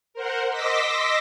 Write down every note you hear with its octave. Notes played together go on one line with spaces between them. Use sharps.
A#4 C5 F#5
D#5 C6 D6 E6 A#6 B6